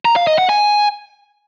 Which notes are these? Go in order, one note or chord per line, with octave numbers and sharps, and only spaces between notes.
A#5
F5
D#5
F#5
G#5